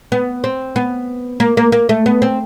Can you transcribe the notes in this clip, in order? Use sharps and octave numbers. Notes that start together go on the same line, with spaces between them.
B3
C4
B3
A#3
A#3
A#3
A3
B3
C4